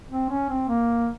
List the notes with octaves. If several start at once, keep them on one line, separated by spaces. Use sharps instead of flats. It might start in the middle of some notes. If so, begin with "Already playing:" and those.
C4
C#4
C4
A#3